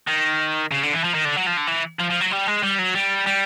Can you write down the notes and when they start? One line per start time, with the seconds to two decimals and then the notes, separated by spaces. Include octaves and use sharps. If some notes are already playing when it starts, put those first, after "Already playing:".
0.08 D#3
0.71 C#3
0.83 D3
0.93 E3
1.04 F3
1.15 D#3
1.25 D3
1.36 F#3
1.47 F3
1.57 D3
1.67 E3
1.99 F3
2.10 F3
2.20 F#3
2.31 G3
2.47 G#3
2.63 G3
2.78 F#3
2.95 G3
3.26 G3